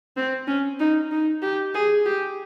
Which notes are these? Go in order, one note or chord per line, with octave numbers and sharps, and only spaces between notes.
C4
C#4
D#4
D#4
G4
G#4
G4